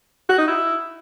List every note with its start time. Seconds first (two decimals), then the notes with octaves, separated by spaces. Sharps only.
0.29 F#4
0.39 D#4
0.48 E4